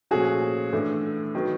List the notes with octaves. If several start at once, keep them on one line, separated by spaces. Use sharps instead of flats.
A#2 F3 A3 C#4 F#4 G#4
A2 E3 A3 D4
D#3 F#3 B3